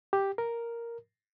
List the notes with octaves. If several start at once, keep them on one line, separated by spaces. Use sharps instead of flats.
G4
A#4